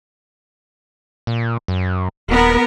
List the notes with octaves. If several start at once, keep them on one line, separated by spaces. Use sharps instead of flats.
A#2
F#2
D#1 B3 A#4